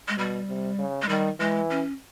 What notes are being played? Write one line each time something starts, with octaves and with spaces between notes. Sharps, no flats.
G#3
B2 G3
C3
C#3
G#3
D#3 G3
E3 G#3
C#4